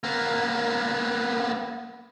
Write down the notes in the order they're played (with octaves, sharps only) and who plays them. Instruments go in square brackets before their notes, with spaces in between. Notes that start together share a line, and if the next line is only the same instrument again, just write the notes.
[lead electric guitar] A#3 B3